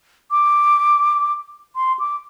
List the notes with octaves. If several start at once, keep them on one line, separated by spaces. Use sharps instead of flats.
D6
C6
D6